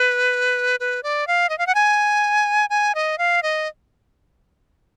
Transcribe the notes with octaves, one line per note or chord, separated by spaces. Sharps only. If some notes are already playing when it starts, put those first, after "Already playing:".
Already playing: B4
B4
D5
F5
D#5
F5
F#5
G#5
G#5
D#5
F5
D#5